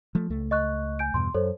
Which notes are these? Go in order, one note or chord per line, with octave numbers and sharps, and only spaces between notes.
F3 A3
C#2 A3
D#5 C#6 F#6
G#5 G6 D7
E2 G2 B2 C6
F#2 A4 C5 C#5